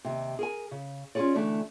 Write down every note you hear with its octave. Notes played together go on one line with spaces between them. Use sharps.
D#2 C3
G#4 A#4 G#5
C#3
C#4 F4 G4 G#4 C#5 D5
D2 E3 A3 D4